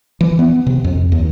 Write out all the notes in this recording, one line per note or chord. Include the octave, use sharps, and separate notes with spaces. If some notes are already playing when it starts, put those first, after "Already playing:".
E3
B3
C3
F2
D#2